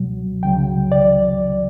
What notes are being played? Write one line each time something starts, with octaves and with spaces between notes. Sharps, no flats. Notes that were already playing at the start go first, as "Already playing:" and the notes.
Already playing: C#2 B2 F#3
C#2 C#3 F#3 G5
D5